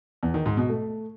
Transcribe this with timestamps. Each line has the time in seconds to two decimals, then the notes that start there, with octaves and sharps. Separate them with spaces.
0.23 E2
0.34 D#3
0.46 G#2
0.57 B2
0.69 A3